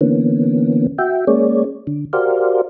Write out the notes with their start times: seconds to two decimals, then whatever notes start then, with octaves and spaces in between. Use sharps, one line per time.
0.01 D3 E3 A#3 B3 C#4
0.99 F#4 E5 G5
1.27 G#3 A#3 C#4 G#4 C#5 D5
1.87 D3
2.13 F#4 G4 A#4 C5 D5 F5